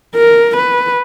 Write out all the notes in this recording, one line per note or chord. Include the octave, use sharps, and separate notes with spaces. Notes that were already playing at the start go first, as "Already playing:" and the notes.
A#4
B4